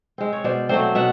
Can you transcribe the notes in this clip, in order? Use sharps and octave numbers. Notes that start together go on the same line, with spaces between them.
G#3 C4
C#5
B2 C5 D5
F#3 A3 C4 C5 D5
B2 E5 F#5